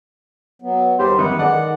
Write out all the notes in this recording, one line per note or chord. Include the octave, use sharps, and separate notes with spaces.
F#3 B3
D#2 G3 D#4 G4 C5
F#2 D#3 E3 B3
D#3 G#3 A4 D5 F#5